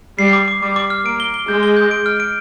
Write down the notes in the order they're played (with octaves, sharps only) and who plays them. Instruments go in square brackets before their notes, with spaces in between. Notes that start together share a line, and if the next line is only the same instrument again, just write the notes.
[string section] G3 [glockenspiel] C7
[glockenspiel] D6
D6
[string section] G3 [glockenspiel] D6
[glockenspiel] D6
F6
[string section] A#3 [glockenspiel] D7
[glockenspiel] G7
G7
[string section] G#3 [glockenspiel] G6
[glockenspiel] G7
G6
D7
F6
D7